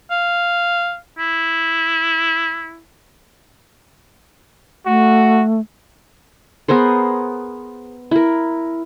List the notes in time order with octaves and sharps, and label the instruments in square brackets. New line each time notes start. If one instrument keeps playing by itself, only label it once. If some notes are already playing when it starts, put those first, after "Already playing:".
[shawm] F5
E4
[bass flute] A3 [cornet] F#4
[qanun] B3 G#4 A#4 C5
E4 A#4